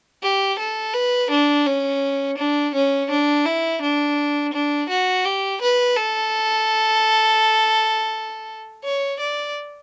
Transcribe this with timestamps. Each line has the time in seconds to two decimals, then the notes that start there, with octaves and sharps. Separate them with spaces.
0.23 G4
0.59 A4
0.94 B4
1.31 D4
1.66 C#4
2.38 D4
2.74 C#4
3.10 D4
3.45 E4
3.81 D4
4.53 D4
4.89 F#4
5.25 G4
5.61 B4
5.97 A4
8.84 C#5
9.20 D5